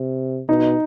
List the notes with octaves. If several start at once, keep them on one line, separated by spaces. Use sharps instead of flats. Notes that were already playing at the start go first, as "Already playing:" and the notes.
Already playing: C3
B2 D#4